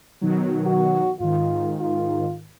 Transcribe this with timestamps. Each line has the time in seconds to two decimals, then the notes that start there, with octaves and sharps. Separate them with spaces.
0.21 B2 D#3 F#3
0.66 F#4
1.20 G#2 D#3 F4
1.81 F4